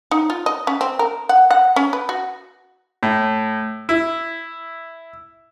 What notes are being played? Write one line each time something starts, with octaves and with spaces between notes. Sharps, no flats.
D#4
F4
D#5
C#4
C4
A#4
F#5
F#5
C#4
B4
F#4
A2
E4